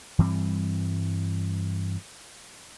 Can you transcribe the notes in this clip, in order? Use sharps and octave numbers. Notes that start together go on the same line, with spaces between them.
G2 E3 G3 C4